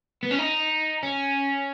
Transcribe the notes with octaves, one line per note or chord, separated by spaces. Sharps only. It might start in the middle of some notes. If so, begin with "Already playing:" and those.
B3
C#4
D#4
C#4